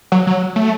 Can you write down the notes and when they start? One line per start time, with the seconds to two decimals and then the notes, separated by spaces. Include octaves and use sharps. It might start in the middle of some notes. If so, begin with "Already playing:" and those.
0.12 F#3
0.27 F#3
0.56 A3